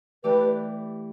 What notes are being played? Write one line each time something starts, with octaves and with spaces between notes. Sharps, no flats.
E3 A3 G4 B4 D5